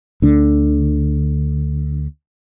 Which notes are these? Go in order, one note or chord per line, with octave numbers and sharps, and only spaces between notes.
D2 D3